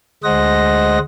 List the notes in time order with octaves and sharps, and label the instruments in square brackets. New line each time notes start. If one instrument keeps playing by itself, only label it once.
[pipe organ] D2 G#3 C5 D#5 F#5 A#6